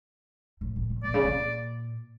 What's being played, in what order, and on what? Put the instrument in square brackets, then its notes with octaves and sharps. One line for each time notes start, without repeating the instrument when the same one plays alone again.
[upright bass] A2
A#2
A#2
[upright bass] A#2 [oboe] D5
[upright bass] C#3
A#2